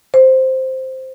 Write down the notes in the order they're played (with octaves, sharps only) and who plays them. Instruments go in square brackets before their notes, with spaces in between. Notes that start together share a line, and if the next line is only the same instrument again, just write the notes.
[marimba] C5